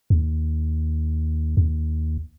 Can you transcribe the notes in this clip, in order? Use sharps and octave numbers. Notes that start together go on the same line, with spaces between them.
D#2
D#2